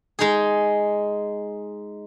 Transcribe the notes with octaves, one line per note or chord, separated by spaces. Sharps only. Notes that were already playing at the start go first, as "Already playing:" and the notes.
G#3 D#4 G#4